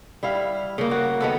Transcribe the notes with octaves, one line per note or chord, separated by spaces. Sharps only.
G3 E4 F5
C#3 A#3
F#4
D#3 B3 A4